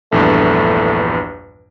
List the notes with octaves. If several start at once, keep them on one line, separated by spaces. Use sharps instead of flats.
A#1 E2 G2 A3